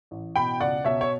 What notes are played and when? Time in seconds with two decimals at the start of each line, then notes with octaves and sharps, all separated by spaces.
0.11 A1
0.36 B2 G5 B5
0.60 C#2 D5 F#5
0.84 B2 C#5 E5
1.01 C#5